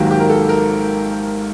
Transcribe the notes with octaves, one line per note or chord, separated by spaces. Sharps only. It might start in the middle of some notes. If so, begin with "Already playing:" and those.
Already playing: G#1 G#2 D#3 F#3 A#3 G4
G4
A#4
A4
A#4